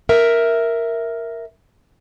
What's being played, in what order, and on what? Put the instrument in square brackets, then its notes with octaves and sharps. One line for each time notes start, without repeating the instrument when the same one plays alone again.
[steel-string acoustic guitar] A#4 E5